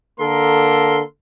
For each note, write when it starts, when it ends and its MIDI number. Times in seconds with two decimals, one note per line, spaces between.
0.19 1.01 50
0.19 1.01 58
0.19 1.01 69
0.19 1.01 70
0.19 1.01 84